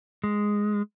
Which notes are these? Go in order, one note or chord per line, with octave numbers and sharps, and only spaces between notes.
G#3